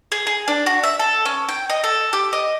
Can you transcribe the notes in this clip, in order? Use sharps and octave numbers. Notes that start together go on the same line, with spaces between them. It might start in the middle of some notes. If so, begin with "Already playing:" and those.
G#4
G#4
D4
F#4
E5
A4
C#4
G5
D#5
A4
G4
D#5